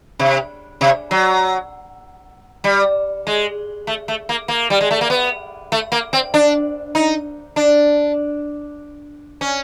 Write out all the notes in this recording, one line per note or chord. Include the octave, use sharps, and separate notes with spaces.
C3
C3
F#3
G3
G#3
A3
A3
A#3
A#3
G3
G#3
A3
A#3
B3
A3
A#3
C4
D4
D#4
D4
C#4